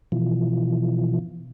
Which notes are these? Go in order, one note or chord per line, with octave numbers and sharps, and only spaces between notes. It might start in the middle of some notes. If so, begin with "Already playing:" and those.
B2 E3 F3